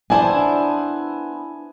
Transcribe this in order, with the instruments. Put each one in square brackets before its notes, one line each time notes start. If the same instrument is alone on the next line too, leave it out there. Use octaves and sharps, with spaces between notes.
[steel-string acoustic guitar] B3 E4 C5 [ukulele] D4 A5 [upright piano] G#5